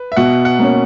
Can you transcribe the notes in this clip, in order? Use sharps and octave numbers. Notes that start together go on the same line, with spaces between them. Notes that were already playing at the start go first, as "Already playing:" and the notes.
Already playing: B4
E5
B2 F#5
F#5
A#3 C#4